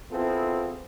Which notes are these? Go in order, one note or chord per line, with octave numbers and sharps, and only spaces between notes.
B3 C4 E4 F4 G#4 A4